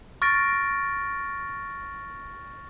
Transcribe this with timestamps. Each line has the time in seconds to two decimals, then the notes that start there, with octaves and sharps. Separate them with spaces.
0.22 C#6 F6 A6 A#6 D7